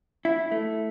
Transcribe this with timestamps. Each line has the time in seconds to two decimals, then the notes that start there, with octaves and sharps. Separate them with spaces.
0.25 E4
0.52 A3